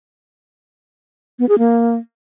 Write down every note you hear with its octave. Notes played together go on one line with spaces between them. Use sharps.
B3
G#4
A#3